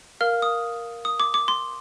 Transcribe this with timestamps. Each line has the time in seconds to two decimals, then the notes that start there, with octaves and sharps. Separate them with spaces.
0.21 A#4 F5 F6
0.42 D#6
1.05 D#6
1.20 D6
1.34 D6
1.48 C6